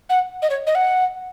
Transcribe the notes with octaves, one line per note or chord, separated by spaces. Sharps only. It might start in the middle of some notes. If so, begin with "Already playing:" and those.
F#5
D#5
C#5
D#5
F#5